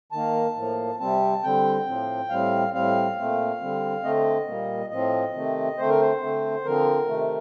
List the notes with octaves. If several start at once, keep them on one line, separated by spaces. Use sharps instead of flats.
D#3 A#3 A5
A2 F3 A#3
C3 G3 C4 A5
D3 G3 C4 G5
A2 F3 C4
A2 G3 C4 F5
A2 G3 C4 F5
A#2 A3 C4
D3 G3 C4
D3 A3 C4 D#5
A#2 G3 A#3
A2 F3 C4 D#5
C3 D#3 A3 C4
D3 A3 C4 C5
A#4
C5
D3 A3 C4
D3 F3 C4 A#4
C3 D#3 A3